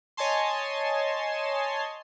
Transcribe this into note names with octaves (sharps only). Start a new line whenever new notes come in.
C#5 D#5 G#5 A5 C6